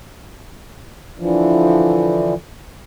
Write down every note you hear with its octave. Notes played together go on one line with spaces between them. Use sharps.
D3 E3 F3